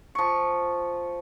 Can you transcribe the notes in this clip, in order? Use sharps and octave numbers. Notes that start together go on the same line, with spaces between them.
F3 C#6